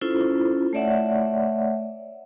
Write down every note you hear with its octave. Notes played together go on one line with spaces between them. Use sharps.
C#4 E4 F4 A4 C5
A3 C#5 D5 E5 F#5